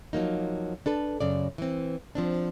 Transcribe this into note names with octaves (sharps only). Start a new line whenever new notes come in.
F3 F#3 A#3 D#4
D4 A4 B4
F#2 C#3 D5
E3 C4
F3 C4 D4